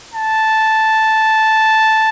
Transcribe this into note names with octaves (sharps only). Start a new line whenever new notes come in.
A5